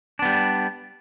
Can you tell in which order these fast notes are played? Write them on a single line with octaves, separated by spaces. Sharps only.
D4 B3 G3